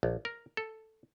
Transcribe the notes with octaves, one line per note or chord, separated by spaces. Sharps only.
A#1
A#4
A4